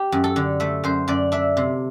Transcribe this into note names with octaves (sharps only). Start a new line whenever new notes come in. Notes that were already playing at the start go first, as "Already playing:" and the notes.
Already playing: G4
F#2
A4
D3
A3 E5
F#2 C5
F#2 D5
D4 E5
C3